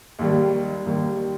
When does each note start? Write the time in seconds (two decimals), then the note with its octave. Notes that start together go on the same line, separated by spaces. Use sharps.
0.19 D#2 D#3 G3
0.86 D#2 D#3 G3